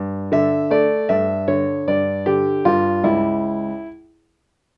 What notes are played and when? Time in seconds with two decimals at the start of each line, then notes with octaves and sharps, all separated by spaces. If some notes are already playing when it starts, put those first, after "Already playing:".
Already playing: G2
0.32 D3 E5
0.71 A3 D5
1.09 G2 E5
1.48 D3 C#5
1.88 G2 D5
2.26 D3 G4
2.65 G2 F4
3.03 C#2 E4